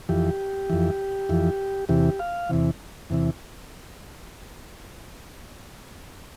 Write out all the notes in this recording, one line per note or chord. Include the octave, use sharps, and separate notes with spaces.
F2 E3 G4
F2 E3
F2 E3
E2 C3 E3 G4
F5
E2 C3 E3
E2 C3 E3